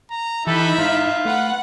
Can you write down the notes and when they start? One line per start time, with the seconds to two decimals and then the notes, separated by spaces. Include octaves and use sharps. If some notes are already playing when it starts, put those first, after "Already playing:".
0.10 A#5
0.47 E3 D#4 E4 G4 A4 B4 E5 B5
0.78 G#2 F4
1.25 A3 B4 F#5